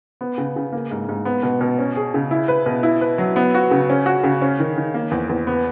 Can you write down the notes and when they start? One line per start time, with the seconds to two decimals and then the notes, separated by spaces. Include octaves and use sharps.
0.21 B3
0.38 C#3
0.56 C#3
0.72 A#3
0.91 G#2
1.09 G#2
1.25 B3
1.43 B2
1.61 B2
1.79 C#4
1.96 G#4
2.14 C#3
2.31 E4
2.48 B4
2.66 B2
2.83 E4
3.01 B4
3.18 F#3
3.36 B3
3.54 F#4
3.71 C#3
3.90 C#4
4.06 F#4
4.23 C#3
4.42 C#4
4.60 D#3
4.77 D#3
4.94 A#3
5.11 E2
5.29 E2
5.47 B3